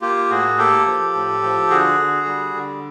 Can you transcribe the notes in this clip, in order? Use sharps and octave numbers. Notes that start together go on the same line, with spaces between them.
A#3 F4 G4
A2 F#4 G#4
A#3 G4 A4
F3
A2
F3
D3 F#4 G#4
D3
G3
D3